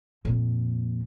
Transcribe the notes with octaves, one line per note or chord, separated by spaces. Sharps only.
F2 A#2